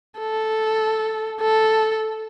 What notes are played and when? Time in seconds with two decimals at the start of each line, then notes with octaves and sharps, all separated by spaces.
0.19 A4
1.41 A4